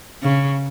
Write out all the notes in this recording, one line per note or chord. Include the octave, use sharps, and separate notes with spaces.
C#3